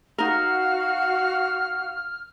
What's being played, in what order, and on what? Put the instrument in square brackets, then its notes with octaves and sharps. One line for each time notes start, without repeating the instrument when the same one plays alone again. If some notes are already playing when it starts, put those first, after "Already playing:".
[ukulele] D#4 A#4 [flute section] F#4 F5 [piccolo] F6